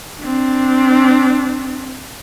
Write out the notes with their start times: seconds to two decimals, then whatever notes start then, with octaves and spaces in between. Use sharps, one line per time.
0.21 C4 D4